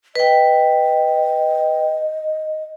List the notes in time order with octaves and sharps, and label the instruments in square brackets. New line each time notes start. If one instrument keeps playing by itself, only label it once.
[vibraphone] B4 G5 [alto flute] D#5